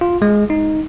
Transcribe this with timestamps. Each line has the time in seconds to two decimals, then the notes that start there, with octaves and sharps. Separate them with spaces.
0.01 F4
0.22 G#3
0.50 D#4